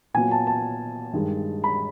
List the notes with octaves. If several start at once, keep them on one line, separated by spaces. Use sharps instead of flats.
A#2 F#3 B3 G#5
A5
A5
G2 D#3 G#3
B5